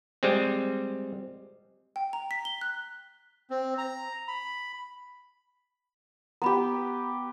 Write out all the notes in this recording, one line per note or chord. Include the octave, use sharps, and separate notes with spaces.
G3 G#3 C4
G5
A#5
B6
G7
F#6
C4
A#5
B5
B3 G4 A#5 B5